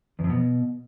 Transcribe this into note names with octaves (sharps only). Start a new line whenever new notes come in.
E2
F2
B2